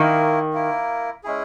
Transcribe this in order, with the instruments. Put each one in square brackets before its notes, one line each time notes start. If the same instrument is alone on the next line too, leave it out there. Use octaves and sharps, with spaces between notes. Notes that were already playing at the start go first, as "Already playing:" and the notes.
Already playing: [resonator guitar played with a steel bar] D#3 [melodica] A#3 E4 A#4
[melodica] A#3 E4 A#4
G#3 C#4 E4 G#4